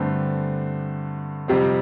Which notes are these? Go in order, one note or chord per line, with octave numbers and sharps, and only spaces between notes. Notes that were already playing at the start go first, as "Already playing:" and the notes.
Already playing: G2 D3 A3 C4
F2 C3 G3 C4